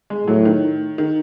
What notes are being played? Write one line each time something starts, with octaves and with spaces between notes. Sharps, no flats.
G#3
A2 F#3
D#3
D#3